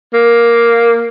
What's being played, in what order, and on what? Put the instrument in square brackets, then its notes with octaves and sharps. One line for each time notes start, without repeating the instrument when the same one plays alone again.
[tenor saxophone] A#3